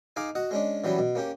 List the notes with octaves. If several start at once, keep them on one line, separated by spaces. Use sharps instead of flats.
D#4 G#4 D#5 F5 G#5 D6
F#4 D#5 F#5
G#3 C#4 D4
E3 F#3 G3 B3 C#4
B2
A#3 C#4 G4